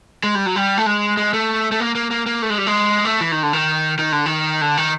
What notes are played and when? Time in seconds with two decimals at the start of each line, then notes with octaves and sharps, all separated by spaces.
0.23 G#3
0.35 G3
0.46 F#3
0.56 G3
0.78 A3
0.86 G#3
1.17 G#3
1.33 A3
1.72 A3
1.80 A#3
1.95 A#3
2.11 A#3
2.26 A#3
2.42 A3
2.50 G#3
2.58 G3
2.67 G#3
3.05 A3
3.21 E3
3.32 D#3
3.43 D3
3.53 D#3
3.99 D#3
4.12 D3
4.26 D#3
4.61 D3
4.77 D#3